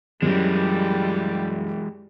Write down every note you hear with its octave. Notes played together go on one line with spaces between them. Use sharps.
F#2 E3 G3 G#3